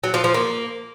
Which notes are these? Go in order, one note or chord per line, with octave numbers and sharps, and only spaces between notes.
F#3
F3
F3
A#3